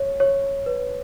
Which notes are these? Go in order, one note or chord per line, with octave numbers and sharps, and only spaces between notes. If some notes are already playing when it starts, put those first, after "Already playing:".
Already playing: C#5
C#5
B4